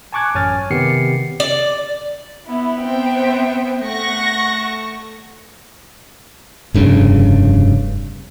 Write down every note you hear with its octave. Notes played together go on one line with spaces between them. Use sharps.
G#5 A5 C#6 D6 F#6 G#6
A1 F#2 C#5 G#5 F6 A6
C3 D#3 B3 G4 C7 C#7
D5
B3 E4
C4 E5 G5
A3 F#5 C#6 A#6
F1 G2 C#3